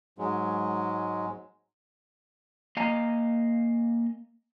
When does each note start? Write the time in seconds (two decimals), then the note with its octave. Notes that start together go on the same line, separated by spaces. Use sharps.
0.18 G#2 F#3 G#3
2.77 A#3 D#5 F5 G#5 A#5